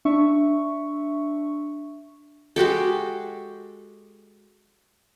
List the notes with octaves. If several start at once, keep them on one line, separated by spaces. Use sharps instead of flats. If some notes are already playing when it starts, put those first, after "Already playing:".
D4 E5 C#6
G#3 F#4 G4 A4